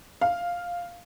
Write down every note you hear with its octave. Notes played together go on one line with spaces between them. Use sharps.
F5